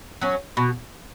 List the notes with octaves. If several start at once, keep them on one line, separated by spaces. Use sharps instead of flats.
F#3 C#4
B2